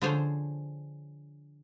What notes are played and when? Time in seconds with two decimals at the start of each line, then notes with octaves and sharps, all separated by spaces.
0.02 D3 F3 F4 G#4 C5 C#5